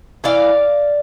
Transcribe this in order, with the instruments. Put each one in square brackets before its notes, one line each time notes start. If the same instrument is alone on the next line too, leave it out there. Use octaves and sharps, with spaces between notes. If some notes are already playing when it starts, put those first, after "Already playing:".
[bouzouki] E3 D5 F5